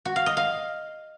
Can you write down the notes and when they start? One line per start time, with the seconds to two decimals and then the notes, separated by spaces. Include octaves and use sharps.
0.05 F#4
0.16 F5
0.26 D#5
0.37 F5